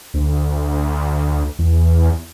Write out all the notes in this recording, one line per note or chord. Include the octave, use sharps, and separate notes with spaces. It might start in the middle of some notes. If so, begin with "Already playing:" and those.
D2
E2